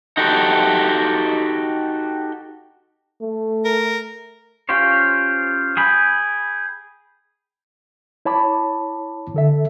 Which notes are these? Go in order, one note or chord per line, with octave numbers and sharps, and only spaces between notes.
D#4 F#4 G4 A4
A3
A#4
C#4 F4 G4 C5 C#5
G#4 G5 B5
E4 C#5 A5 B5 D6
D3 A4 E5